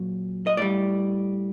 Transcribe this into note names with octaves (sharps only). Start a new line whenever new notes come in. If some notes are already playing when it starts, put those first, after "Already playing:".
Already playing: A#2 F#3
D#5
A2 G3 D5